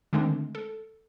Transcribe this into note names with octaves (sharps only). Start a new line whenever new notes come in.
D3 D#3 G#3 A3 C4 D4
A4